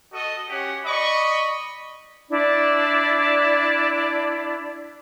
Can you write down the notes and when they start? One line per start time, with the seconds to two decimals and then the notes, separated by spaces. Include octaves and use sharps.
0.12 F#4 A4 D#5
0.49 C#4 G4 C#5 F#5
0.85 D5 D#5 B5 C#6
2.30 D4 E4 D5